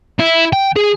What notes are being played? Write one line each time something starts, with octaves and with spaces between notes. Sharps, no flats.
E4
G5
G#4